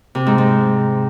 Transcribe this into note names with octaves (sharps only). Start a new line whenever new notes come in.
C3
G#2
G#2